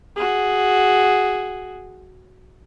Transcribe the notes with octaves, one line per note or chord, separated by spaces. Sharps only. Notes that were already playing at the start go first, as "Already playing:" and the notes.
F#4 G#4